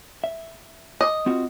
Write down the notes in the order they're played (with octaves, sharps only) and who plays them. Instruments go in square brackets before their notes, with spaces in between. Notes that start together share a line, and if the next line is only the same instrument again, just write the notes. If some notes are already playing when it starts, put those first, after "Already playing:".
[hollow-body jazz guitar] E5
[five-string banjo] D#5
[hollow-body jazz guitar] C4 F4 F#4